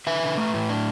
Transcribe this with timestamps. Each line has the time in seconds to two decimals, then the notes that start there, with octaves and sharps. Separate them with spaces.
0.07 D3 B4 E5
0.23 D3
0.37 A3
0.54 A2
0.69 D4